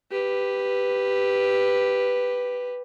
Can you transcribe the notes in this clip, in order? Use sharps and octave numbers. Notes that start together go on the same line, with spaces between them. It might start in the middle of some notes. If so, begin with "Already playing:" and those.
G4 B4